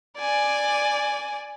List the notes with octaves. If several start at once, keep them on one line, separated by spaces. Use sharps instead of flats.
D5 G#5